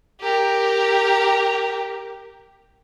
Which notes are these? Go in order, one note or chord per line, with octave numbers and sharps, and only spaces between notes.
G4 A#4